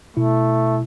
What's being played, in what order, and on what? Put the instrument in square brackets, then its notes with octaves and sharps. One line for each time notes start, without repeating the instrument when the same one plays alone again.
[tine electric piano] B2 E4 [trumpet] A3